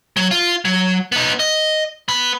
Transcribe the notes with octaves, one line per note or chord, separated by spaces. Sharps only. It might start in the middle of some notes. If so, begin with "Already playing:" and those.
F#3
F4
F#3
B3 D#4
D#5
B3 B5